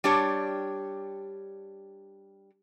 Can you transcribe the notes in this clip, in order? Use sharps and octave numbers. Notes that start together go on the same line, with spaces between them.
G3 D4 G4 C#5